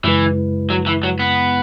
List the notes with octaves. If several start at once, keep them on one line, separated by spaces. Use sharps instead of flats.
F#2 C#3 E3 G#3 E4 B4
F#3
E3
F#3
B3